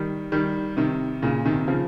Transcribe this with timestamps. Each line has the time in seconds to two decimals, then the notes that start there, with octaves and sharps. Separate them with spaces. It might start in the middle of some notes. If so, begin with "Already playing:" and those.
Already playing: D#3 G3
0.32 D#3 G3
0.77 C3 D#3
1.22 A#2 C#3
1.45 C3 D#3
1.68 C#3 F3